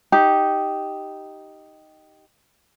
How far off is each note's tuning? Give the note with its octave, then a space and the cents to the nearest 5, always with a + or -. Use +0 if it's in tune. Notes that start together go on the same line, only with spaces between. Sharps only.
D#4 +0 G4 -5